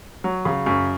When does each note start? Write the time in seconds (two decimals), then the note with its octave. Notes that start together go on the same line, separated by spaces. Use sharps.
0.24 F#3
0.45 C#3
0.66 F#2